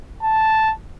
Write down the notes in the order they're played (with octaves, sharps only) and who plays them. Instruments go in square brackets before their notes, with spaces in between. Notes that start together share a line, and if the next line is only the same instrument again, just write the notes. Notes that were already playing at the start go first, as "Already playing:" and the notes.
[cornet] A5